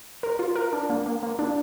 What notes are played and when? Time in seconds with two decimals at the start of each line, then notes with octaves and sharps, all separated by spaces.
0.23 A#4
0.39 F4
0.56 A#4
0.73 D4
0.90 A#3
1.06 A#3
1.23 A#3
1.39 D4